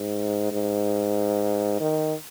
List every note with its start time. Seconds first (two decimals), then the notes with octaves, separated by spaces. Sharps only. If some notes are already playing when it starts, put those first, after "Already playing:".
Already playing: G#2
0.52 G#2
1.80 D#3